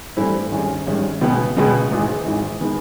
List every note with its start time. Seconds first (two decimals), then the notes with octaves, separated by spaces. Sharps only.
0.17 G2 E3 A3 C4 E4
0.51 G#1 G2 D#3 G#3 C#4
0.86 G#1 G2 D#3 G#3 C#4
1.21 C#2 B2 G#3 B3
1.57 C#2 B2 G#3 B3
1.91 G#1 G#2 E3
2.26 G#1 G#2 E3
2.61 D#3 G#3 B3